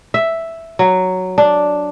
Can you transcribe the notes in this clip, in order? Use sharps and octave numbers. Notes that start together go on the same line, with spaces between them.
E5
F#3
D4